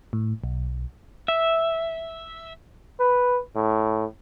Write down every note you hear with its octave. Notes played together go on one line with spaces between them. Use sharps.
A2
B1
E5
B4
A2